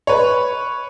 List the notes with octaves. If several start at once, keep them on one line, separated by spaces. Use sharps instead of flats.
B4 C#5